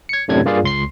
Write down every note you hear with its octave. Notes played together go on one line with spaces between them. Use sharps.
G#6 C#7
F#2 A2 C3 D4 G#6
G2 A#3 F4 G#4 D5 F5
C#2 C6 C7